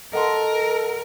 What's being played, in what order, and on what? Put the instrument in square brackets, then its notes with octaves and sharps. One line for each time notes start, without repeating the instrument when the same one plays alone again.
[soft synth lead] A4 [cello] A#4 [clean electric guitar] D#5 F#5 C6